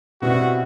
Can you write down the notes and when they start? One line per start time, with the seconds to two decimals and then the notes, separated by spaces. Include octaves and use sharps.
0.22 B2 G3 C4 E4 F#4 B4